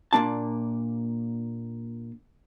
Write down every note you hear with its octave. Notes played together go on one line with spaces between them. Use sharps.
A#2 A#3 D4 A5